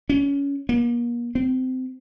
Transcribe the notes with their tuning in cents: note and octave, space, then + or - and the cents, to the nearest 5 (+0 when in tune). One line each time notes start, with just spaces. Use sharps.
C#4 +20
A#3 +40
C4 -25